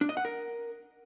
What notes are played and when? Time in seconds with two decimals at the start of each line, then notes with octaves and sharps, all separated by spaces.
0.01 D4
0.09 D#5
0.17 F#5
0.25 A#4